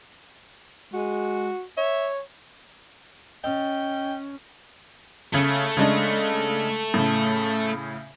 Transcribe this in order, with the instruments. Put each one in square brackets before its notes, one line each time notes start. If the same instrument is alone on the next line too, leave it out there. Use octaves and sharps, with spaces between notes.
[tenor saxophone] G#3 [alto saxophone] F#4
[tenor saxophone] C#5 [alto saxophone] E5
[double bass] C#4 [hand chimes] D#5 [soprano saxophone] G5
[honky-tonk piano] C#3 [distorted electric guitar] A3
[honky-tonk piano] C#3 G#3 D4
A2 C#3